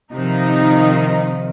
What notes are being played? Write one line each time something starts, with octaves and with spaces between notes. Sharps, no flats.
C3 D#3 F3 D#4